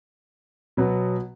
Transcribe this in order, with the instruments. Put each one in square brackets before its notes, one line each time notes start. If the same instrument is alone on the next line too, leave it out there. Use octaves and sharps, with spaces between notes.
[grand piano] B2 F#3 B3